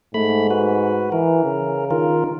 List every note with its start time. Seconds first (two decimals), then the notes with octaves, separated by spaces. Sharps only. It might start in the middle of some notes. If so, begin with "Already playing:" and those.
0.14 G#2 A3 B5
0.50 F#4 B4
1.12 E3 A#4
1.44 C#3
1.91 D#3 F4 A#4